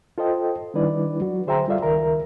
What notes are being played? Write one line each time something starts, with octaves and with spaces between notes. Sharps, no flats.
F4 A4 C5 D#5 G5
D#3 G3 D4 E4 B4 D5
F#3 F#4
D3 G#4 C5 E5 G5 A#5
G3 F4 A4 D5 E5 F5
C#2 D#3 A#4 E5 A#5